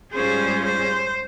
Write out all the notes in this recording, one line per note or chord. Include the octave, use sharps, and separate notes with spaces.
G#2 G3 C#4 F4 G#4 C5
C5